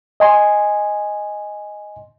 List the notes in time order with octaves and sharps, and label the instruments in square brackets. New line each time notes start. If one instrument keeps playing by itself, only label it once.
[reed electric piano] D#5 G#5 C6